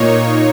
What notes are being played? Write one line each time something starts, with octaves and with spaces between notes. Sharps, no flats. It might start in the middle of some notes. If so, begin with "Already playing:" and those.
Already playing: A#2 A#3 D#4 C#5